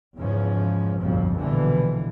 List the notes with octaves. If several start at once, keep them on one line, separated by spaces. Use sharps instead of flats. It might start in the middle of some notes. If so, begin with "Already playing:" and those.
E2 G#2 C#3 F3 C#4
G1 C2 F2 A#2 F3 F#3
A#1 B2 D3 E3 F3 G3